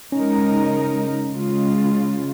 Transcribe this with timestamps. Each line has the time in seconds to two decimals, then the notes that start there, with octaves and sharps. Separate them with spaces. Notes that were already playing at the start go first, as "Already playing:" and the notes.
0.12 C#3 G#3 C#4 D#4 A#4
1.31 C#3 G#3 F4